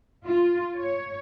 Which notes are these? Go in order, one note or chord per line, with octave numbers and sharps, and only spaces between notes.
F4
C#5